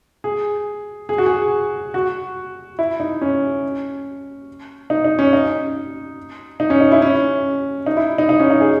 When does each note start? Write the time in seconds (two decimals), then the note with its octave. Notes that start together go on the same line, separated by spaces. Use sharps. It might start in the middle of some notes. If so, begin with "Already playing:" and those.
0.24 G#4
1.09 G#4
1.18 F#4
1.26 G#4
1.94 F#4
2.79 E4
3.00 D#4
3.21 C#4
4.90 D#4
5.04 D#4
5.19 C#4
5.33 D#4
6.60 D#4
6.70 C#4
6.81 D#4
6.92 E4
7.02 C#4
7.86 D#4
7.97 E4
8.18 D#4
8.29 D#4
8.40 C#4
8.51 D#4
8.61 G#4